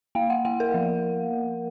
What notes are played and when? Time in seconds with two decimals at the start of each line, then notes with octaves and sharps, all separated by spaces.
0.15 A#3 F5
0.30 F#5
0.45 A#3 F#5
0.60 A#4
0.74 F3